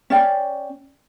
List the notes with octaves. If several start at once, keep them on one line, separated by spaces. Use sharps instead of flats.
C#4 D5 G5